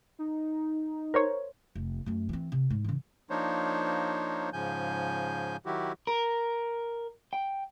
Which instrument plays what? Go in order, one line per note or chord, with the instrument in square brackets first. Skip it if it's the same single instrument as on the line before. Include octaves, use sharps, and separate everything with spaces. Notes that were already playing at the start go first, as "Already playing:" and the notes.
[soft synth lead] D#4
[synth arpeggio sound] A#4 C5 C#5
[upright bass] F1
F#2 A3
E3 C4
C3
G#2
C#3 E3
[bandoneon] F3 A#3 D4 D#4 C5 C#5
G#2 C#3 F3 G#5 G6
D#3 F#3 E4 F#4 G4
[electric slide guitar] A#4
G5